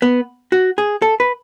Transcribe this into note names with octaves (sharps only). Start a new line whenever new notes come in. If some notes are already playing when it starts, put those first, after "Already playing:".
B3
F#4
G#4
A4
B4